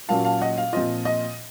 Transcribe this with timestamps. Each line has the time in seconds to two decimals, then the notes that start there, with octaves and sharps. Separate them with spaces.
0.09 A#2 F#3 A#3 C#4 F5 A5
0.25 F5 A5
0.41 D#5 F#5
0.58 F5
0.73 A#2 F3 C4 F4 D#5
1.05 D#5